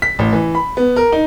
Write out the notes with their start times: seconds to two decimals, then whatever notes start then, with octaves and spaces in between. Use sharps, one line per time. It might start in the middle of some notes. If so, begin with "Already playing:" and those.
0.02 B6
0.19 A1
0.33 E3
0.55 B5
0.77 B3
0.96 A#4
1.12 D#4